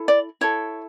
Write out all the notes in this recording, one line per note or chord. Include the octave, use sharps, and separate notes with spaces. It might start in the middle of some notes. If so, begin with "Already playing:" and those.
Already playing: E4 A4
D5
E4 A4 C#5